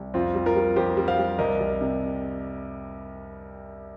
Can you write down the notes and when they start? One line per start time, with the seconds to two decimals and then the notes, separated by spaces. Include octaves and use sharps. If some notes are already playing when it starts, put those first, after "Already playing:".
Already playing: C2
0.14 F2 C4 F4
0.35 G3
0.46 F4 A#4
0.56 G3
0.76 F2 G4 C5
0.97 G3
1.08 C5 F5
1.19 G3
1.39 C2 A#4 D#5
1.60 C2
1.81 C3